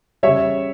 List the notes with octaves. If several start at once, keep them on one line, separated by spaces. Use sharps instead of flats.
C#3 G3 C#5 E5